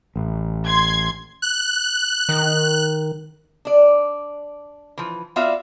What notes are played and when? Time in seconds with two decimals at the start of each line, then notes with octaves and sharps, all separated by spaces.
0.16 A1
0.67 C6 G#6
1.42 F#6
2.29 D#3
3.65 D4 D5
4.98 E3 F3
5.36 B3 F4 F#4 D5 E5 F5